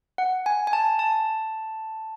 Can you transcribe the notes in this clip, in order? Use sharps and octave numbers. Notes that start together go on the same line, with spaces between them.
F#5
G#5
G#5
A5
A5